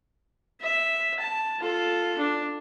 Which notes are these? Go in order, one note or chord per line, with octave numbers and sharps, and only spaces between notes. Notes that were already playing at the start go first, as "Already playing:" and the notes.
E5
A5
F4 A4
D4